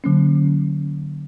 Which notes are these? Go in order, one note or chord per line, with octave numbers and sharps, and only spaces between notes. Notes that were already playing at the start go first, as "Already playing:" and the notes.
D3 F#3 A#3 C#4